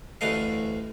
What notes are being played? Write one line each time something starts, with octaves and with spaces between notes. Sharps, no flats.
A1 D2 E3 A3 D#5 F5